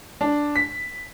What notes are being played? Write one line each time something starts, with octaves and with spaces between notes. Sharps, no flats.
D4
B6